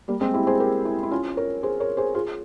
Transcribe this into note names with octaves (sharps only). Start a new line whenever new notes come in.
G3 A#3
G#3 C4
E4 G4
G#4 C5
G4 A#4
E4 G4
E4
C#4 F4
A#4 C#5
G#4 C5
A#4 C#5
G#4 C5
F4 G#4